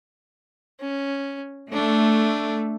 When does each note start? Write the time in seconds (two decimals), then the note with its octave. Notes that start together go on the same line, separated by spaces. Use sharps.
0.80 C#4
1.73 A3 D4